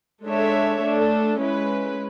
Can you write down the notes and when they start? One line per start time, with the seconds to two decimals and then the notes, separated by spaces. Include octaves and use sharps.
0.24 G#3 D4 A4 C#5 E5
0.82 A3 D4 A4
1.39 G#3 C#4 E4 B4